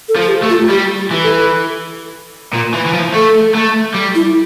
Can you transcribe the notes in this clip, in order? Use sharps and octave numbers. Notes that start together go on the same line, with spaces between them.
A4
F3
A4
G4
A3
F4
G3 G4
E3
A4
A#2
E3
E3
F3
A3 A4
A3
G3
E4